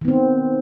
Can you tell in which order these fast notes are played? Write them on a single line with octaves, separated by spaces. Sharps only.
D#3 B3 C4